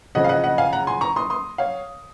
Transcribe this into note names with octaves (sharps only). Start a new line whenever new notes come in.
C#3 F3 C4 D#5 F#5
F5
D#5 F#5
D#5 F#5
F5 G#5
F#5 A#5
G#5 C6
A#5 C#6
C6 D#6
C6 D#6
C#5 F5